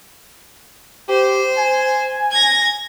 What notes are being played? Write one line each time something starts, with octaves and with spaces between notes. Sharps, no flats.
G4 C5
G#5
G#6 A#6